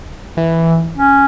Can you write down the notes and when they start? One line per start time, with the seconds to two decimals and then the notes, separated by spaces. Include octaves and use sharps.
0.37 E3
0.97 C#4